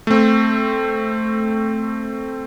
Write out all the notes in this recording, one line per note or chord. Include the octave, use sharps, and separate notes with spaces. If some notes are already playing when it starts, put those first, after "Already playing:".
A3 C4